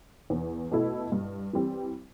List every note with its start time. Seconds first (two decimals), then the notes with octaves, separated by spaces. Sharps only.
0.30 E2
0.71 B2 A3 E4 A4
1.12 G2
1.53 E3 G3 C4